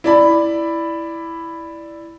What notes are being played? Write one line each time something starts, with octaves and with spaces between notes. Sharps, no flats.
E4 D5 B5